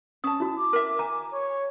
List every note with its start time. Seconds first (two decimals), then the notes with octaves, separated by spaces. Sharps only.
0.24 C#4 A5 D#6
0.40 E4 F#4
0.57 D6
0.73 A#4 E5
0.99 G#5 A#5
1.31 C#5